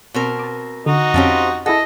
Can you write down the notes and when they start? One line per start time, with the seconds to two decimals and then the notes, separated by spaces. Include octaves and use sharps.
0.14 B2 C4 A#4
0.39 A5 D6
0.86 D3 D#4 F#4
1.14 F2 F3 C4 C#4 G4
1.66 E4 G#4 A4 D#5 F#5